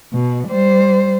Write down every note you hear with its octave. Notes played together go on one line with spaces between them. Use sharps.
B2
G3 C5